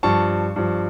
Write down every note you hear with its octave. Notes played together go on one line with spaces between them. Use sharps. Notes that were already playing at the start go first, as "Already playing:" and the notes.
G2 F3 A5 C#6
G2 F3